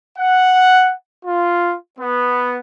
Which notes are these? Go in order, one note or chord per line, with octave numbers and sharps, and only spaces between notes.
F#5
F4
B3